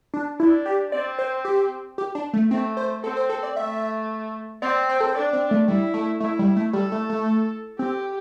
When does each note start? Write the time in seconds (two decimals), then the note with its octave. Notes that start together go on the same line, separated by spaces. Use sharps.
0.14 D4
0.39 D4 E4
0.66 G4
0.92 C4 D5
1.19 C5
1.45 G4
1.98 G4
2.15 D4
2.33 A3
2.51 A3 C4
2.77 C5
3.04 C4 A4
3.17 C5
3.30 A4
3.43 D5
3.56 A3 E5
4.62 C4 D5
4.89 C5
5.01 A4
5.07 C5
5.15 D4 D5
5.33 C4
5.51 A3
5.68 G3 E4
5.94 A3
6.20 A3 E4
6.39 G3
6.56 A3
6.73 G3 A4
6.92 A3
7.10 A3
7.79 C4 G4